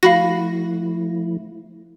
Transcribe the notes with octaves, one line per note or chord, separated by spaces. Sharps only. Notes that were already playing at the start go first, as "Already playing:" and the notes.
F3 A3 E4 F#4 F5 B5 A#6